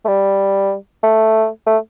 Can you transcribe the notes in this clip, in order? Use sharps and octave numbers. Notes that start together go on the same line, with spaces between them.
A3
G3
A3
A3